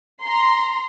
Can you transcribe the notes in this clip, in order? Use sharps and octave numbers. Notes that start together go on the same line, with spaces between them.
A#5 C6